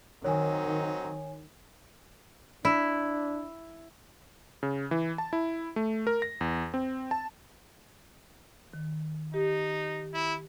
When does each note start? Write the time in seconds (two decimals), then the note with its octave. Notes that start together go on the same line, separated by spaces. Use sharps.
0.25 D#3 F#3 C4 D#4 C#5 G#5
2.65 D4 E4
4.63 C#3
4.91 E3
5.18 A5
5.33 E4
5.76 A3
6.07 A#4
6.22 A#6
6.41 E2
6.74 C4
7.11 A5
8.74 D#3
9.34 D#4 G4
10.14 E4